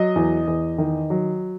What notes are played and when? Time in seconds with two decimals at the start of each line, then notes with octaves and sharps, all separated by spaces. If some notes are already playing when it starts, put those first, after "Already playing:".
Already playing: F#3 D#5
0.16 E2
0.47 E2
0.78 D#3
1.10 F#3